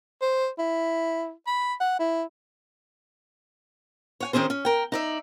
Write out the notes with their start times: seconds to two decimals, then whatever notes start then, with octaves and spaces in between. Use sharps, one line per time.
0.22 C5
0.59 E4
1.47 B5
1.80 F#5
1.99 E4
4.20 C#5 F#5 G#5
4.33 D#3 C4 C#4 G#4 C5
4.50 C#4
4.65 A#4 G5
4.92 D#4 D5 E5